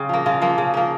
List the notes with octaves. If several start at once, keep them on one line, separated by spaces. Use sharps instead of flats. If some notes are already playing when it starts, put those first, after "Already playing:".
Already playing: C#3 C4
F3 A#3
C#3 F4
F3 A#3
C#3
F3 A#3